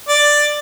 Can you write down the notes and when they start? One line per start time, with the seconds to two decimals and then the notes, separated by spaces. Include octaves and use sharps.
0.09 D5